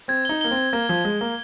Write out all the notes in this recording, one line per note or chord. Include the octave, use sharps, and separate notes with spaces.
C4 G#6
D#4 G7
A#3 G7
C4
G7
A#3 G#6
F3 G#6
G#3 G#6
A#3 G7